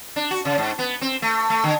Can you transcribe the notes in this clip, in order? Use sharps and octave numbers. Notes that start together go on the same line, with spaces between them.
D4
F#4
C#3
G#2
B3
C4
A3
A3
D3